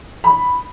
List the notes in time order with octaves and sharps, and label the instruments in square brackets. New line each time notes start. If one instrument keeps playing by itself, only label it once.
[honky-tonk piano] B5